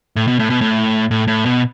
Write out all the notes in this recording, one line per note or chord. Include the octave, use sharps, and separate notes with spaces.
A2
B2
A2
B2
A2
A2
A2
B2